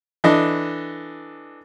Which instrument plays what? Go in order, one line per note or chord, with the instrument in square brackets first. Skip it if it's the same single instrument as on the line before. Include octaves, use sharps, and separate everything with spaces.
[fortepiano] E3 D4 A4 D#5